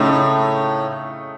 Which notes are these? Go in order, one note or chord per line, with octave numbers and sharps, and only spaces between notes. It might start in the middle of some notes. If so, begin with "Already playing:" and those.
Already playing: A2 C#3 A3 D#4